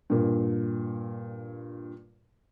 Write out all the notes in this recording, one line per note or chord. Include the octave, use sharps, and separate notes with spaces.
G2 A#2